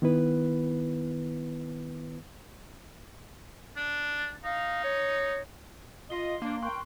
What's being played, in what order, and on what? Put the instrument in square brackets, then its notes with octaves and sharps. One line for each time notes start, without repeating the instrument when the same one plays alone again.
[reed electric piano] D#3 B3 E4 B4
[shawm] D4
[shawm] D#4 [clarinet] F5
[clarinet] C#5
[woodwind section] F4 D#5 [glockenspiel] C6 C7 G7
[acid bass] A#3 [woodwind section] D4
[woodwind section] A#4 G5 [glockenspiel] C6 C#6 F#6